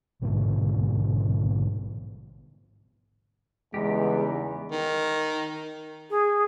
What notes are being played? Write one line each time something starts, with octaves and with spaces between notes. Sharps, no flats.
A1 G#2 B2 D3
E2 C#3 G3 G#3 B3 D#4 G4
D#3
G#4